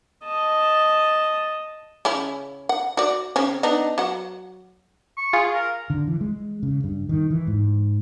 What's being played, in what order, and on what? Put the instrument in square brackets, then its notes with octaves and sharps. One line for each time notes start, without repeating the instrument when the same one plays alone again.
[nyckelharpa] D#5 A5
[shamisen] C#3 C#4 E4
F#5
F#4 D5
C#3 C4 C#4
B3 D4 D#4
F#3 F#5
[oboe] C#6
[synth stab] F4 G#4
[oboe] A#4
[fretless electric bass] D3
E3
G#3
C#3
G2
D#3
E3
G#2